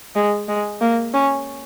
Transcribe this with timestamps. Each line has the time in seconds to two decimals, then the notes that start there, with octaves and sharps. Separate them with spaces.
0.15 G#3
0.48 G#3
0.81 A#3
1.14 C#4